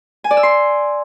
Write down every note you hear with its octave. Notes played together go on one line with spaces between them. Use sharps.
G#5
D5
E6
C6